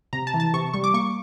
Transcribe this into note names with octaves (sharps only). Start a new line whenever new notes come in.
C3 A#5
A5
E3
A5
C3 C#6
G3 C#6
D6
A#3 C#6